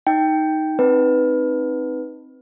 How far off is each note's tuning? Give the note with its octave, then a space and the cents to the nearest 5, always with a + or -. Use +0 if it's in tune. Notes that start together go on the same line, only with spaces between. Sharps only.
D#4 +5 G5 +0
C4 +0 D#4 +0 B4 +0